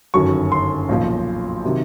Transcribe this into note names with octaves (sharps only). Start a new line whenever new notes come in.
G1 F#2 D#3 F#3 C#6
C6
B1 A#2 F3
C3 D#3 F#3